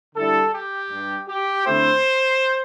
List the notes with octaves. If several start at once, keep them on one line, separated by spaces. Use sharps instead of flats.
D3 G3 E4 A4
G4
G2 G3 D4
G4
D3 A3 C4 E4 C5